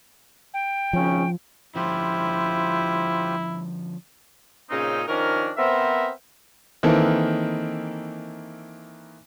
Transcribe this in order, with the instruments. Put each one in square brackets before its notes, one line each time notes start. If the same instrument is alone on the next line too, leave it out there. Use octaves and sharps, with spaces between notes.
[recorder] G5
[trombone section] G#1 C#3 C#4 [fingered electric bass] F3
[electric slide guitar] D3 F3 C#4 [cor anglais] E4 [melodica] F4 G4 C5
[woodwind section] A#2 C#3 C4 C#4 D#4
D#3 F3 C#4 D4 A#4
B3 C4 A#4 C5 E5
[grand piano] D#3 E3 A#3 C4 E4 A4